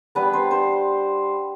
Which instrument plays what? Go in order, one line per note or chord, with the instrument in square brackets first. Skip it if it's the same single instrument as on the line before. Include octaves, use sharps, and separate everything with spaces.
[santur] G3 B3 D4 B4
C5
C5